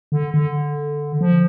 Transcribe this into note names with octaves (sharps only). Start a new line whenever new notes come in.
D3
D3
F3